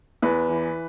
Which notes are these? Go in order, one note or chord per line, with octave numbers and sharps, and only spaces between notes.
E2 B4
E3